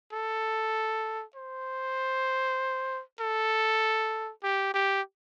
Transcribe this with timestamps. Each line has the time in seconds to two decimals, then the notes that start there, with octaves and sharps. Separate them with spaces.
0.13 A4
1.36 C5
3.20 A4
4.43 G4
4.74 G4